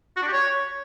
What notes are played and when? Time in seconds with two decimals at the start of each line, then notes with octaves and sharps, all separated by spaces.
0.17 F#4
0.22 D4
0.27 G4
0.33 C#5